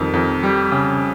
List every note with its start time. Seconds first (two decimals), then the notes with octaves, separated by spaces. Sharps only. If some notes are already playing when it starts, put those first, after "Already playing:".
Already playing: F2 D#3 G3
0.13 F2
0.43 G3
0.71 C#3